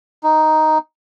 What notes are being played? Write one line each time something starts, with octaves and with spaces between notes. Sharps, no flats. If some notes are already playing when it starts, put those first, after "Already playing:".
D#4